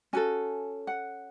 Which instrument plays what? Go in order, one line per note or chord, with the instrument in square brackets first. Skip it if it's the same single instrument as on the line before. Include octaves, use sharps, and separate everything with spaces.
[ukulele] C#4 F#4 A4 G#5
F#5